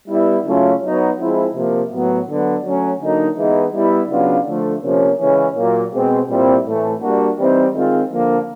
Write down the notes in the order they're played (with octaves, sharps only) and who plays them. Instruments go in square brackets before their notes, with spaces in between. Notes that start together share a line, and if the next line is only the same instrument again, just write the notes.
[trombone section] G3 B3 E4
C#3 F#3 A3 C#4 F4
F#3 B3 D#4
F3 G#3 C4 E4
C3 F3 A#3
A2 F#3 B3
D3 F#3 B3
F#3 A3 C#4
D3 F#3 A#3 D#4
E3 G#3 B3 D#4
G3 B3 E4
C#3 F#3 B3 D4 F4
D3 F3 A3
C3 F3 A#3 C#4
C#3 E3 G#3 C#4
A#2 F#3 A#3
B2 G#3 C4
A#2 G3 C4 E4
A2 E3 A3
G3 A#3 D4 F#4
E3 G3 C4 D#4
D#3 G#3 C4 F4
D3 F3 A#3